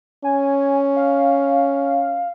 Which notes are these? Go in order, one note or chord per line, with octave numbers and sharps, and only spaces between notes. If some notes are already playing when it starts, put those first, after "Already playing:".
C#4 G#5
F5